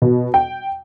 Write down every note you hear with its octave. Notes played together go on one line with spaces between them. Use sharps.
B2
G5